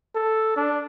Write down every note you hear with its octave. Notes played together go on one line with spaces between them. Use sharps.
A4
D4